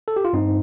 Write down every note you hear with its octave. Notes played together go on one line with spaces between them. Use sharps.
A4
G4
F4
G2 C4 D#4